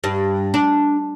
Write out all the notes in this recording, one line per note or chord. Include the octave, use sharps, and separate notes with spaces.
G2
D4